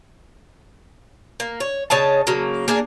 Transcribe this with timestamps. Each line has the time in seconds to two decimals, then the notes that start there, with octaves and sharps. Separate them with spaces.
1.40 A#3
1.60 C#5
1.90 C#3 C#5 D#5 A5
2.27 C#3 F#3 A#3
2.68 A#3 D4 G#4 A#4